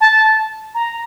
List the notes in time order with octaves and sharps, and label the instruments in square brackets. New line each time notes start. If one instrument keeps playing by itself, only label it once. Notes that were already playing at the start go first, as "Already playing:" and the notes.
[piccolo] A5
A#5